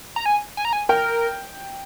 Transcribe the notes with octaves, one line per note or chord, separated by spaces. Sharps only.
A#5
G#5
G#5
A#5
G#5
A#4 G5